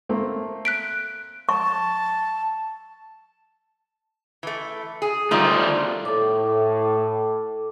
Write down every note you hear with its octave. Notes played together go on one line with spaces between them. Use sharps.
A3 A#3 C4
F#6 B6 D7
A5 C#6
E3 A3
G#4
D3 D#3 F3 G3 A3 F4
A2 A4 D6